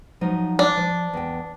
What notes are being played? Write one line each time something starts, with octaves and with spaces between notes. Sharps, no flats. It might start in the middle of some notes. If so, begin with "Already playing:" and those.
F3 F#3 D#4
D4
F3
E2 G5